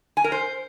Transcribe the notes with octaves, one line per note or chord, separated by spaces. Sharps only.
G#5
A#4
C5